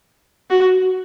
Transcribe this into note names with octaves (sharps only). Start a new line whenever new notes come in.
F#4